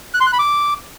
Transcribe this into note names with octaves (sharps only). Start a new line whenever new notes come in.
F#6
C6
F#6
B5
D6